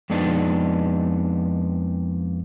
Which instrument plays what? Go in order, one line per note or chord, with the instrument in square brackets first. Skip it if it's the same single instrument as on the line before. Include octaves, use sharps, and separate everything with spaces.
[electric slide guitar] F2 G#3 B3 D4 D#4